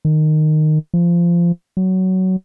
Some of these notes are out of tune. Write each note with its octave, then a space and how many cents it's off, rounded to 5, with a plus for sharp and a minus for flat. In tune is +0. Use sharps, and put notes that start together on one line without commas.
D#3 -15
F3 -20
F#3 +15